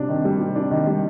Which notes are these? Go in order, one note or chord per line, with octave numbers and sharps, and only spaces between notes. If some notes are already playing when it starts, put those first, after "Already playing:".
Already playing: C3 G3 D4
D#3
G3
C3
D4
D#3
G3